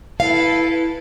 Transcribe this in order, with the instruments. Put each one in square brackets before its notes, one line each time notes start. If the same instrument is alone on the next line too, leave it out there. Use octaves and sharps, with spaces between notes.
[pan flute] E4 [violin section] A4 B4 [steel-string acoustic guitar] F5